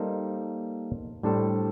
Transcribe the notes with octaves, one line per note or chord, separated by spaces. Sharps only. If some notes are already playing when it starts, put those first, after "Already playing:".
Already playing: G3 A#3 D#4 A4 C5
A2 G3 D4 A4 C5